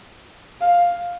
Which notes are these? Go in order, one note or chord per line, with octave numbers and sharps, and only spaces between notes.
F5